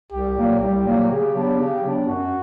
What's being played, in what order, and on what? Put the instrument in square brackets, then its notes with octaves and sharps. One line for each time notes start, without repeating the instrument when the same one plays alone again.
[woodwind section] C2 [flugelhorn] G4
[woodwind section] A#2 F#3 A#3
[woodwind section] C2 [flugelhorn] G4
[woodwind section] A#2 F#3 A#3
[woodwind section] C#3 [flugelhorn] G4
[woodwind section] F#3 B3 D4
C#3
F#3 B3 D4
[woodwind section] F#2 [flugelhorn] F#4